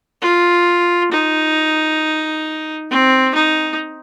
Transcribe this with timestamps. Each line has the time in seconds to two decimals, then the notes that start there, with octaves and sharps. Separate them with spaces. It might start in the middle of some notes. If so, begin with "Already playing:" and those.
0.22 F4
1.11 D#4
2.90 C4
3.35 D#4